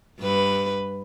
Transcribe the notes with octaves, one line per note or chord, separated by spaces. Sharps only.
G2 B4